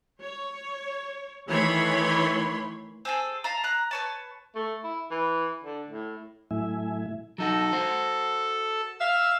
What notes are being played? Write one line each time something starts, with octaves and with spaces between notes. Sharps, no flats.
C#5
D#3 E3 A3 C#5 B5 C6
C4 G#4 A4
F5 A5 A#5
A#5 F#6
B4 C#5 A5
A3
E4
E3
D3
A2
A2 F#3 A3 E4 E5 G#5
F#3 D#4 F#4 A4
F#4 C5
E5 F5 E6